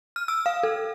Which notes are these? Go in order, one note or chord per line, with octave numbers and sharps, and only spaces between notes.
F6
E6
F5
A4